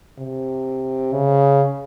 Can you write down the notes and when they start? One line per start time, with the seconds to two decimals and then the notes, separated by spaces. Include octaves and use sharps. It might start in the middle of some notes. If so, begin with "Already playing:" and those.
0.19 C3
1.13 C#3